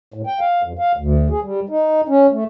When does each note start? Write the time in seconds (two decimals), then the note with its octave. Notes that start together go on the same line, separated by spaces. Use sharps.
0.14 A2
0.27 G5
0.40 F5
0.63 F2
0.79 F5
0.97 D2
1.30 G#4
1.43 G3
1.69 D#4
2.08 C#4
2.32 A3